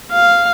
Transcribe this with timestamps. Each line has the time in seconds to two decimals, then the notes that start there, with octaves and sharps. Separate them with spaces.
0.12 F5